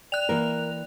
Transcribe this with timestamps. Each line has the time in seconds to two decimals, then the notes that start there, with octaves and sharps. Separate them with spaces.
0.12 D5 G5 F#6 F7
0.29 E3 A#3 A#4